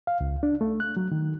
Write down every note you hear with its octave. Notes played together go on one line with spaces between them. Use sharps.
F5
C#2
D4
A3
F#6
F#3
D#3